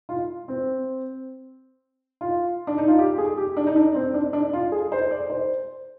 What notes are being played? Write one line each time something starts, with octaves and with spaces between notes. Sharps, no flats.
F4
C4
F4
D4
D#4
F4
G4
G#4
G4
D4
D#4
D4
C4
D4
D4
F4
G#4
C5
D5
C5